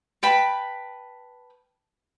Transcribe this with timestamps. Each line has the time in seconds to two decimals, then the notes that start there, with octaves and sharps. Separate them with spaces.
0.23 B4 G5 A5 B5